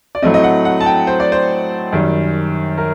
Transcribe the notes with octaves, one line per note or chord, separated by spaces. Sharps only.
D5
A2 F#3 A3 C4 D#5
D#5
F#5
F#5
A5
G5
C5
D5
C5
F#2 D#3 G3
A#4